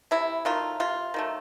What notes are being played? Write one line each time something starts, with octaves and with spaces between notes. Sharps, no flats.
C3 E4
D#3 F#3 A3 F4
C3 F4
D#3 F#3 A3